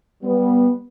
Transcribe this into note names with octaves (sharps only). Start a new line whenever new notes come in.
G3 B3